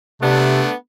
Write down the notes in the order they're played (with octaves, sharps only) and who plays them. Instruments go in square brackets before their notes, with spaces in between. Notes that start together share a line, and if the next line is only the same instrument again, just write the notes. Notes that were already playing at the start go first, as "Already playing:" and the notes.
[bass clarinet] C3 [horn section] A3 B3 D4